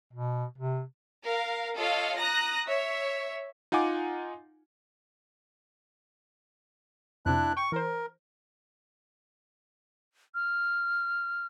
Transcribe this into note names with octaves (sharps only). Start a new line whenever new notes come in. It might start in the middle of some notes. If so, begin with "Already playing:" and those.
B2
C3
A#4 F5
F4 A4 C#5 D#5 F5
A#5 D#6 F#6 A#6
C#5 E5
D#4 F4 F#5 G#5 D6
F2 C3 D4 E4 F#6
G5 C#6
E3 A#4 C5
F6